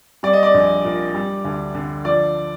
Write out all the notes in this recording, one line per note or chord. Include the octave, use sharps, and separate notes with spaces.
G3 D5
D#5
D5
A#1
A#2
G3
D2
D3
F3 D5